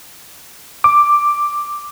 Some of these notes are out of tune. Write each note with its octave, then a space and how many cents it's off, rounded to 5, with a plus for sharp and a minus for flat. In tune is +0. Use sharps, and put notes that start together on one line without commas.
D6 +0